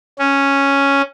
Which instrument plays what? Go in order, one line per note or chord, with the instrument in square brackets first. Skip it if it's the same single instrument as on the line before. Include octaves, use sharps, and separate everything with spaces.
[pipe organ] C#4